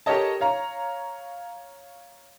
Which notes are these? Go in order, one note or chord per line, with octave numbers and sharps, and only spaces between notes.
G4 A4 A#4 C#5 D#5 A5
C#5 F5 A#5